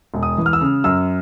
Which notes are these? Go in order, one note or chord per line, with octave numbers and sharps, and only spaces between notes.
E1
D#6
E3
F6
E6
C#3
F#2 E6